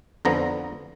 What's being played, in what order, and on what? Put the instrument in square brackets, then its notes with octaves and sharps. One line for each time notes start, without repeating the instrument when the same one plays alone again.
[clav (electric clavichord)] F2 D3 F3 B3 A#5